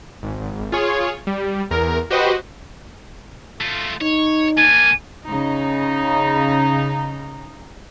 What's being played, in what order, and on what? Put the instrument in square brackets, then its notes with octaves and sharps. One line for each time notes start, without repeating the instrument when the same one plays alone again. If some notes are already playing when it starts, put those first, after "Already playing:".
[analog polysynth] G#1
F4 G#4 C#5
G3
E2 A#4
F#4 G4 B4 C5 D#5
[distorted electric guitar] A3 F4
[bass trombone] D#4 [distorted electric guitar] C#5
[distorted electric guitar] A#3 D4 [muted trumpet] G#5 [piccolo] D#7
[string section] C#3 D#4